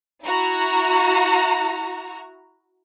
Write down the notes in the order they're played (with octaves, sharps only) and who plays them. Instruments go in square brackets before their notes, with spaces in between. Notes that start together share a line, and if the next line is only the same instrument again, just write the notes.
[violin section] E4 F#4 A#5